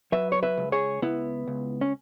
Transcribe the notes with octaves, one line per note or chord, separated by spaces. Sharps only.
F#3 B4 E5
C#5
B4 E5
C#2
G#4 C#5
C#2 B3 E4
C#2
C#4